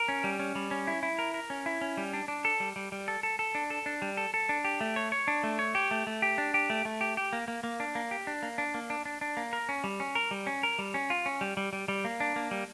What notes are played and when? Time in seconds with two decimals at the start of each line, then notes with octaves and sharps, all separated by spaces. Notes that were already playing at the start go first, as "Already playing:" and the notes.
Already playing: A#4
0.08 C#4
0.24 G3
0.40 C#4
0.55 G3
0.71 C#4
0.87 E4
1.03 E4
1.19 A#4
1.34 A#4
1.50 C#4
1.66 E4
1.81 C#4
1.97 G3
2.13 D4
2.28 D4
2.45 A4
2.60 G3
2.76 G3
2.92 G3
3.08 A4
3.23 A4
3.39 A4
3.55 D4
3.70 A4
3.86 D4
4.02 G3
4.17 A4
4.34 A4
4.49 D4
4.65 G4
4.81 A3
4.96 C#5
5.12 C#5
5.28 D4
5.43 A3
5.59 C#5
5.75 G4
5.91 A3
6.07 A3
6.22 G4
6.38 D4
6.54 G4
6.70 A3
6.85 A3
7.01 G4
7.17 G4
7.33 A#3
7.48 A#3
7.64 A#3
7.80 D4
7.95 A#3
8.11 G4
8.27 D4
8.43 A#3
8.58 D4
8.74 A#3
8.90 D4
9.05 D4
9.21 D4
9.37 A#3
9.53 A#4
9.69 C#4
9.84 G3
10.00 C#4
10.15 A#4
10.31 G3
10.47 C#4
10.63 A#4
10.79 G3
10.94 C#4
11.10 F4
11.26 C#4
11.41 G3
11.57 G3
11.73 G3
11.88 G3
12.05 A#3
12.20 D4
12.36 A#3
12.51 G3